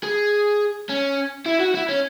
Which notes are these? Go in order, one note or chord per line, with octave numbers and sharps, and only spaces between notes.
G#4
C#4
E4
F#4
E4
C#4